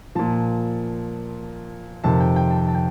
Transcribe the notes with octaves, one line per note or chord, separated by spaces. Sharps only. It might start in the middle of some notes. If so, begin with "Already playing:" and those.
A#2 F3 A5
F2 C3 D#3 A5
G5
G5
A5
A5
G5